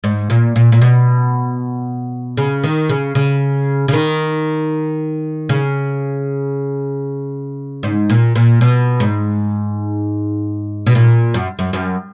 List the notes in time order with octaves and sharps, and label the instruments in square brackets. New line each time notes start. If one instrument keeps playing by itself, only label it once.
[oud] G#2
A#2
A#2
A#2
B2
C#3
D#3
C#3
C#3
C#3
D#3
C#3
G#2
A#2
A#2
B2
G#2
B2
A#2
F#2
F#2
F#2